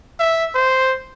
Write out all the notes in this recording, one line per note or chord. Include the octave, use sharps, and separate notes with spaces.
E5
C5